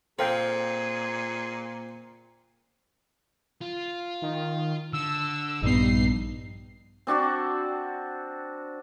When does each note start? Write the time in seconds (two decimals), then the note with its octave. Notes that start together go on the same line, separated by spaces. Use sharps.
0.19 A#2 C4 G#4 A4 F5 G5
3.62 F4
4.22 D#3
4.93 D3 E6
5.62 A#1 G2 B3 D#4 C7
7.07 C4 D4 F#4 D5